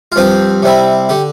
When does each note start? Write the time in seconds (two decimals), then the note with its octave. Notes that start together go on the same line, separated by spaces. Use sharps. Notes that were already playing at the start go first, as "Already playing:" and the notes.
0.12 F4
0.16 G2 F3 C4 G4
0.63 C3 G3 C4 E4
1.09 D3 G4